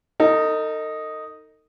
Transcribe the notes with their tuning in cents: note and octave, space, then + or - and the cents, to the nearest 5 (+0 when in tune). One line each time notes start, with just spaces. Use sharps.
D#4 +0 A4 +45